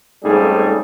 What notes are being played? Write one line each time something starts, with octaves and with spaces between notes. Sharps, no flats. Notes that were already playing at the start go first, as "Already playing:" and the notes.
F2 G#2 C#3 G3 A3 G#4